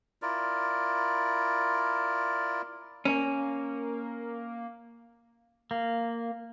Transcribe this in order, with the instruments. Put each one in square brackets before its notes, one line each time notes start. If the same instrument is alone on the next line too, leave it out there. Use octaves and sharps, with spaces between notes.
[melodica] E4 F4 A#4 D5
[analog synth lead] A#3 [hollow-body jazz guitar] C#4
[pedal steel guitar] A#3